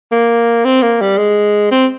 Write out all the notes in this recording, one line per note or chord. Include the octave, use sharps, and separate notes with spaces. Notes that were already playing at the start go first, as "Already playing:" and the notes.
A#3
C4
A#3
G3
G#3
C4